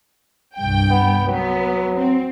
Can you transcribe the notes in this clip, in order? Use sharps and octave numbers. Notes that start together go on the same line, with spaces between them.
C2 G2 G5
B3
F#3 B3
C4